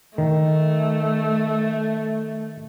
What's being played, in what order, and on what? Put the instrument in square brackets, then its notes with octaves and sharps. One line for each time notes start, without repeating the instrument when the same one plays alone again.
[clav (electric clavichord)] D#3 [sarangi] A3